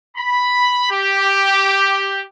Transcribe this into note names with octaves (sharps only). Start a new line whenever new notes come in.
B5
G4